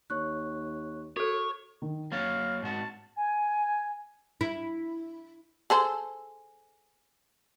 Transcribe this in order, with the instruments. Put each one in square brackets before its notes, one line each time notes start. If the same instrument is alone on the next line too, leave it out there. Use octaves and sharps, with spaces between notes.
[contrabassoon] D#2 [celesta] C#5 C#6 F#6
[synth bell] F#4 A4 [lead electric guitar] C#5
[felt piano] D#3
[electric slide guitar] F#3 A#3 C#5 [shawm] F5 [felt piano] A6
[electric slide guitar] G#2 F#4 [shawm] A5
[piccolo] G#5
[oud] E4
[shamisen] G#4 A4 C5